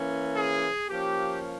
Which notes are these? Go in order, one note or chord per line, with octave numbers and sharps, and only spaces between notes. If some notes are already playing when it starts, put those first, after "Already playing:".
Already playing: E3 A#3 C#4
G#4
F3 A#3 C#4 G4